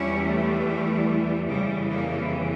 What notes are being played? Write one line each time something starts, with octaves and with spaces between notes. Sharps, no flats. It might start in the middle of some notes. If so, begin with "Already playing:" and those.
Already playing: E2 E3 G3 C#4 E4
A3
F2 C#3 E3 G3
G3 A#3